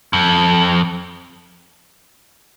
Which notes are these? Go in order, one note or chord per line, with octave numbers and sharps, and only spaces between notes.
F2